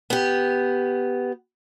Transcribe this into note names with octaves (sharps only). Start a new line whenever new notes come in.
B3 G4